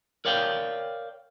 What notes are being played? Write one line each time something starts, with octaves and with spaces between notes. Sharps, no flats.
A#4 C#5 D5 F5 G5